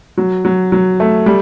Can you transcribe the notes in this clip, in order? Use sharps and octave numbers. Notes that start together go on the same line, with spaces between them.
F#3
F#3
F#3
A3
G3